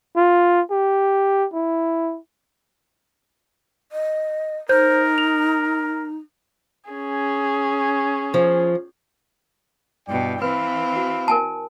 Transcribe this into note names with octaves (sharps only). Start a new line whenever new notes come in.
F4
G4
E4
D#5
D#4 A#4 C5 G6
F7
C#4 G#4
F3
G2 B2 E4 D5 G5
E3 C4 B4 F5 B5
F#4
A#4 G#5 A5